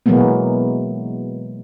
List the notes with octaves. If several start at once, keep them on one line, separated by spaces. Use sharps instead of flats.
B2 E3 F#3 G#3 A#3 B3